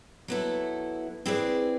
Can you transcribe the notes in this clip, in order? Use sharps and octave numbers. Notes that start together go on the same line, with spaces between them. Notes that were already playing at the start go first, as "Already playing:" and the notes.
F#3 B3 E4 A4
C4 E4 G#4 B4 D5